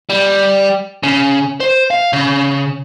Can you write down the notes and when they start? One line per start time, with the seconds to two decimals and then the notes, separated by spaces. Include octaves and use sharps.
0.10 G3
1.03 C#3
1.60 C5
1.91 F5
2.13 C#3